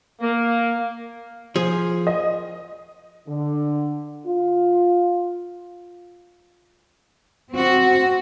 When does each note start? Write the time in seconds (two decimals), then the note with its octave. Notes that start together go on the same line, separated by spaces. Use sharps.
0.21 A#3
1.56 F3 G#4
2.07 D#5
3.28 D3
4.26 F4
7.51 C4 F#4